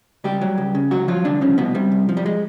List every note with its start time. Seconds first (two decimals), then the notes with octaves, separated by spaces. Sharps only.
0.24 C#2 G3 G4
0.42 F#3
0.58 C#2
0.75 C#3
0.91 C#2 F#3 F#4
1.08 F3 F#3 F4
1.25 C2 D3 D4
1.41 C#3 F3 C#4
1.58 C2 B2 B3
1.75 C3 G3
1.92 C2
2.09 F3
2.17 G3
2.26 G#3